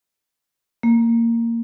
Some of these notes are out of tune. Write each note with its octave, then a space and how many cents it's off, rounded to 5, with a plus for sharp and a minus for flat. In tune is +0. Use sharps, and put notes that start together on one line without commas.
A#3 -15